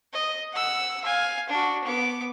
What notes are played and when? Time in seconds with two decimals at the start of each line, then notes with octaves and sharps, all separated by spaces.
0.13 D#5
0.53 F#5 E6
1.04 F5 G#5
1.49 D4 F#4
1.84 B3 D6